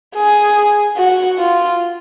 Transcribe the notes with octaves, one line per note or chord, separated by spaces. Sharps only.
G#4
F#4
F4